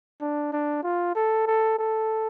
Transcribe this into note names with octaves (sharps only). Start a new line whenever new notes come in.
D4
D4
F4
A4
A4
A4